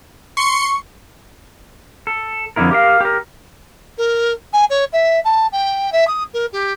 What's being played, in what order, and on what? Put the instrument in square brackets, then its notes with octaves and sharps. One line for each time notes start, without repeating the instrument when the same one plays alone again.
[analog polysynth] C6 C#7 [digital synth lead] C#6
[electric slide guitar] A4
F2 B2 D3 E4 A#4
G4 A#4 F5
G4 A#4
[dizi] A#4
G#5
C#5
E5
A5
G5
E5
D#6
A#4
G4